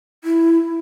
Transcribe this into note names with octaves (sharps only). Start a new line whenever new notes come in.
E4